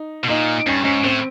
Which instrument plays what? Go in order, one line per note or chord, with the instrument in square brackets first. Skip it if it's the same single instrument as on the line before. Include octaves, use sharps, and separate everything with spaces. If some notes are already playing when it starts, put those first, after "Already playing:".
Already playing: [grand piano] D#4
[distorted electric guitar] B2
[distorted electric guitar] A#2 [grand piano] D#4
[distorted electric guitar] G2 [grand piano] C#4
[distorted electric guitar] G#2 [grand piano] C#4
[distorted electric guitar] A2 [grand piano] C4